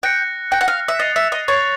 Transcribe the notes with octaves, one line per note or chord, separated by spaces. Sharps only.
G5 F#6 A#6 C#7
G5 F#6 A#6 C#7
F#5
F5
E5
D#5 A6 C7 F7
E5
D#5
C#5 A6 C7 F7